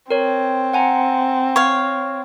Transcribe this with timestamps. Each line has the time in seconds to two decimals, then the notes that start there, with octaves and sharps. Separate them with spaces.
0.11 C4 A#4 C#5
0.73 F#5 G#5 A#5
1.56 C#5 F5